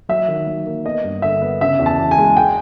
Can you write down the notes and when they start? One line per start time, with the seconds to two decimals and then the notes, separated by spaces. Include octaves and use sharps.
0.09 F#3 E5
0.28 D#3
0.47 F#3
0.66 A#3
0.85 B3 D#5
1.04 G2
1.22 D3 E5
1.42 B3
1.61 C#3 E5
1.79 E2
1.86 A5
1.99 E2
2.11 G#5
2.18 G#3
2.37 G5